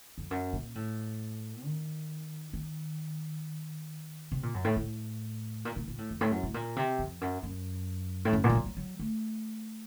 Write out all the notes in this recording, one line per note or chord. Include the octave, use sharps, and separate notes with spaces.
F2
F#2
A#2
A2
D#3
D#3
C3
A#2
F#2
A2
A2
A#2
A#2
A#2
A2
F2
A2
F#2
A2
A#2
C3
F2
F#2
F#2
A2
F#2
A#2
A3
F#3
F#3
F#3
A3